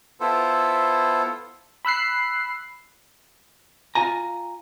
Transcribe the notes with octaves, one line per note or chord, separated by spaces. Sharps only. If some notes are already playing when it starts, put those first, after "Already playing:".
B3 E4 F4 A4 C5
B5 E6 F#6 C7
F4 G#5 A#5